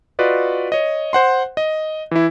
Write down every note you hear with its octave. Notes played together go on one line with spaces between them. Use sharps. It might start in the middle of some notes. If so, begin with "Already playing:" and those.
F4 F#4 B4 D5 D#5
C#5 D#5
C5 F#5 C6
D#5
E3 E4